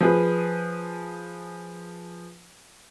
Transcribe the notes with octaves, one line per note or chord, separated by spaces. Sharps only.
F3 G#4 B4